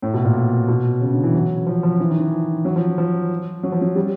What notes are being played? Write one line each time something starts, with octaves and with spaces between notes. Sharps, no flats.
A2
B2
A#2
B2
C#3
D3
E3
F#3
F3
F3
E3
D#3
E3
F#3
F3
F3
F#3
F3
F#3
G3